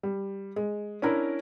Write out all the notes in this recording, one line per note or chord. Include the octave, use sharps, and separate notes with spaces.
G3
G#3
C#4 D4 E4 A#4